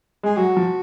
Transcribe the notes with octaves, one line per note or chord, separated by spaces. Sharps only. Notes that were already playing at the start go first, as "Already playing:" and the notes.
G#3 G#4
F#3 F#4
F3